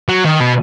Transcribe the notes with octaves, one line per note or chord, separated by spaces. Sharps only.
F#3
D#3
B2